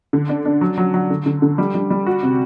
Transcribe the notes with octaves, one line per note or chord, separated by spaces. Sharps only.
D3
D4
D4
F#3
F#3
F#3
D3
D3
D3
G3
G3
G3
F#4
C3